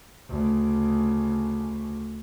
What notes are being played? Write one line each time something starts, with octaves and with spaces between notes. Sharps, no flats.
D2 C#3